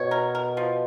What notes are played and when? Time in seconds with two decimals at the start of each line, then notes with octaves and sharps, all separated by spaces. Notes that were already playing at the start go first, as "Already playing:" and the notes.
Already playing: B2 C#5
0.11 A#4
0.35 A#4
0.57 F3